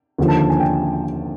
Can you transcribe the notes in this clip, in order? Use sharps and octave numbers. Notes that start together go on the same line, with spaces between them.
D#2 D3 F3
A5
A5
G#5
G5